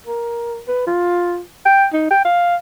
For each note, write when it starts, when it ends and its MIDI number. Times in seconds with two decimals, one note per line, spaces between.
0.07 0.59 70
0.68 0.83 71
0.87 1.40 65
1.66 1.87 79
1.93 2.10 63
2.11 2.22 79
2.25 2.56 77